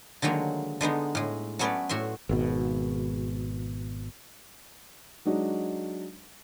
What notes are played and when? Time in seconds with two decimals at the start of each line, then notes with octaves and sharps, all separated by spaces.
0.22 D3 D#3 F#3 G#3 A#3
0.81 D3 G#3 B3 D#4
1.15 A2 G#3
1.59 F#3 A3 B3 C#4 B4 D5
1.89 A2 F#4 E5 C6
2.29 G#1 B2
5.25 F#3 G#3 D4 D#4 F#4